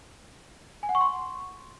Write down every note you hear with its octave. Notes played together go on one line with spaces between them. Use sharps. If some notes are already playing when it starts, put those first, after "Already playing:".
G#5
F#5
C#6
C6